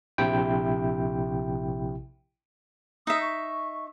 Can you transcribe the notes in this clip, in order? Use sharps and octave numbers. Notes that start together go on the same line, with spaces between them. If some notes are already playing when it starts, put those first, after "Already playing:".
A#1 C3 E4 G5
D#4 E5 D#6
C#6